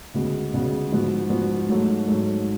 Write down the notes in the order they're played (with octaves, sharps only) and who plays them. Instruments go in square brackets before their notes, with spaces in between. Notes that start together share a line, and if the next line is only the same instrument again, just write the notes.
[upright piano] D2 C#3 G#3 B3 F#4
D2 C#3 G#3 B3 F#4
G#2 F3 B3 F#4
G#2 F3 B3 F#4
G#2 F#3 A3
G#2 F#3 A3